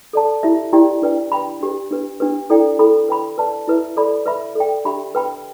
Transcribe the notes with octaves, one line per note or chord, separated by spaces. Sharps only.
A4 D5 A5
E4 G4 E5
E4 G4 D5 G5
D4 B4 D5 G5
B4 G5 B5
D4 G4 B4
D4 G4 B4
D4 G4 B4
E4 A4 D5 G5
E4 A4 G5 B5
B4 G5 B5
B4 D5 A5
E4 B4 E5
A4 D5 B5
B4 E5 B5
A4 D5 G5
D4 G4 E5 B5
B4 G5 B5